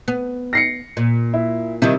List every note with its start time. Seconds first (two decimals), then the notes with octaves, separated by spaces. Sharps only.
0.08 B3
0.53 A#6 C7 C#7
0.97 A#2
1.34 E4
1.82 C3 D#3 G3 E4